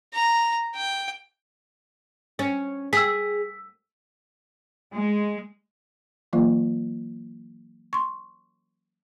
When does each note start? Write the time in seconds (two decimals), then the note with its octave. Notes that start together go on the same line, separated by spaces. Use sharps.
0.14 A#5
0.75 G5
2.39 C#4
2.93 G#4 E6 B6
4.95 G#3
6.33 E3 F#3 A#3 F4
7.93 C6 C#6